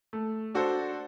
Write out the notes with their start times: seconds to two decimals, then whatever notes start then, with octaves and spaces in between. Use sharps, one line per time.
0.13 A3
0.55 D4 F#4 A4 C5